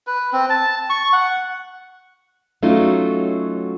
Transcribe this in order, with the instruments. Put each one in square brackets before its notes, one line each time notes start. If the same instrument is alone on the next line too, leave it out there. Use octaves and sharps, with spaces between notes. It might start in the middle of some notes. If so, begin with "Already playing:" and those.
[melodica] B4
C4
A5
C#6
F#5
[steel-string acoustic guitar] F#3 A3 C#4 D#4 F4 F#4